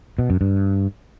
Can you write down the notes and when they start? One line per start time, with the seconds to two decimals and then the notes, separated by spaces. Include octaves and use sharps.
0.18 B2
0.30 F#2
0.41 G2